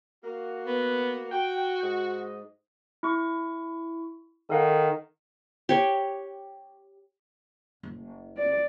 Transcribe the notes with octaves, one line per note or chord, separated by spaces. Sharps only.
A#3 F#4
B3
F#4 G5
G#2 D#5
E4 C#6
D#3 A4 F5 F#5
G4 C#5
F#1
D5